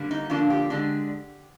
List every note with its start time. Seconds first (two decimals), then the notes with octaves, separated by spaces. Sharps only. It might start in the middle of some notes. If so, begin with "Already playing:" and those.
Already playing: D3 G3 A#3
0.11 D#4
0.30 D3 F3 A#3 D4 F4
0.50 G4
0.70 D3 G#3 D4